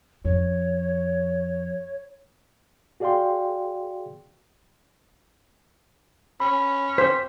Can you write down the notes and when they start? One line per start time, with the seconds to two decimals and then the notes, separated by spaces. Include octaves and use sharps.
0.25 F2 C#4 C#5
3.00 F#4 G#4 D5 F5 G5 C6
6.40 C#4 B5
6.98 C5 B6